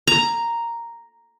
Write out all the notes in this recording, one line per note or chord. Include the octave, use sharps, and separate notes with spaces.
A#5